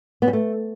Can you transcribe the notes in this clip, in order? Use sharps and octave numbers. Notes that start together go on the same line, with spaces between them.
B3
G3
A3